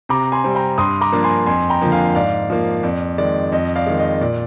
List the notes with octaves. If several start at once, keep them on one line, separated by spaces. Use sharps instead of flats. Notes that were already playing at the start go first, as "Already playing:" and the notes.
C3 A#5 D6
G#5 C6
G3 C4
G5 A#5
G2 C6 D#6
A#5 D6
F3 A#3 D4
G#5 C6
F2 G#5 C6
G5 A#5
D3 F3 A#3
F5 G#5
G#2 D5 F5
F3 A#3
F2 D5
D#3 G#3 D5
F2 D#5
D5 F5
D#3 G#3
D#5
A#2 D5